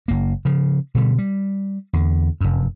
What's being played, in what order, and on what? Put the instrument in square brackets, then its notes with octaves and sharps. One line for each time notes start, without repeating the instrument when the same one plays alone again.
[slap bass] F#1 A#3
C#3 F3
B2 D3 G3
G3
E2 D3
F1 F#2